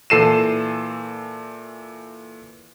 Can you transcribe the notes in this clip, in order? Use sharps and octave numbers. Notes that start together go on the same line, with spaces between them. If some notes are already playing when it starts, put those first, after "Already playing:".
A#2 E3 A4 C7 D#7 E7